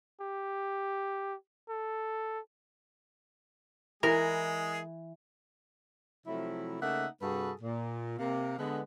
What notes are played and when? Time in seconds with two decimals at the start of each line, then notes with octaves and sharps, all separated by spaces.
0.21 G4
1.69 A4
4.03 E3 G#3 G#4 A#4
6.27 C3 F3 F#3 A3 E4
6.80 C#3 A3 A#3 D#4 E5 F#5
7.22 G2 C3 F#4 G#4 A4 B4
7.62 A#2
8.19 C3 A#3 F5
8.58 D3 G#3 B3